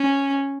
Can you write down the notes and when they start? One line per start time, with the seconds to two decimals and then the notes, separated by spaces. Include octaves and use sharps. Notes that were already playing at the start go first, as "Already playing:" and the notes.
Already playing: C#4